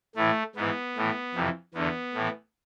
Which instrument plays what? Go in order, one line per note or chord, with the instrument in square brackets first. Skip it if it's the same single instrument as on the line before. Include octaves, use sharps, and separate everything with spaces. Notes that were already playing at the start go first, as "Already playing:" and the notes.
[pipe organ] A2 E3 A3
G#2 E3 B3
A2 E3
F2 C3 E3
E2 D3 B3
A2 E3